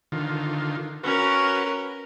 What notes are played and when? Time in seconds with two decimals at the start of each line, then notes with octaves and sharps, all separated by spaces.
0.12 D3 D#3 F4
1.04 C#4 F#4 A#4 B4